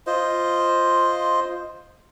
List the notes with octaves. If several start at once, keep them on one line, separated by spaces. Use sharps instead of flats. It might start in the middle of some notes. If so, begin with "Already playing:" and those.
F4 C5 D#5